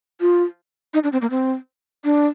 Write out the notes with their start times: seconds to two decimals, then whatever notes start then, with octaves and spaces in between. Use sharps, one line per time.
0.21 F4
0.94 D#4
1.04 D4
1.12 C4
1.22 A#3
1.30 C4
2.04 D4